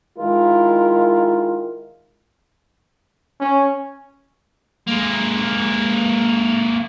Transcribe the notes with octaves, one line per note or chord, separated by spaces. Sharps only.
D#3 G#3 E4 F4 A#4
C#4
G#3 A#3